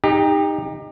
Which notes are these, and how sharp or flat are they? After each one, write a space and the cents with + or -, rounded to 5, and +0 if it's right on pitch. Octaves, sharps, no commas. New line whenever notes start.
D#4 +0 G4 +30